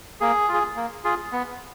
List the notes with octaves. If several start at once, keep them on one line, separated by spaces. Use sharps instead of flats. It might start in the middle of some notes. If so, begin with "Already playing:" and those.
A#3 G#4
F4 G#4
A#3
F4 G#4
B3